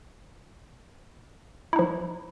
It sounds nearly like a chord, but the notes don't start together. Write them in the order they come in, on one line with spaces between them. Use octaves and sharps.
E4 D#4 F3